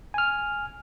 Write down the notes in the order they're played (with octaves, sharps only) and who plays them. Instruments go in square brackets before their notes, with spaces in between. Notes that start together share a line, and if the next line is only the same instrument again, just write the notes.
[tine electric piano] G#5 F6